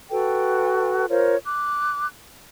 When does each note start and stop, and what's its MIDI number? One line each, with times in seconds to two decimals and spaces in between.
0.11 1.06 66
0.11 1.06 69
0.11 1.06 71
0.11 1.06 79
1.09 1.36 65
1.09 1.36 70
1.09 1.36 72
1.09 1.36 73
1.45 2.08 86
1.45 2.08 90